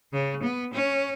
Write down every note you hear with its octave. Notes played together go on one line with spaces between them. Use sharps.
C#3
B3
C#4